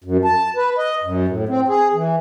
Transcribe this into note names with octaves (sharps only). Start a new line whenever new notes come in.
F#2
A5
B4
D#5
F#2
A2
C4
G#4
E3